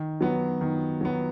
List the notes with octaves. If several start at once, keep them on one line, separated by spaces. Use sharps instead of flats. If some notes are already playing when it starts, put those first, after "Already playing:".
Already playing: D#3
F#3 B3
D#3
F#3 B3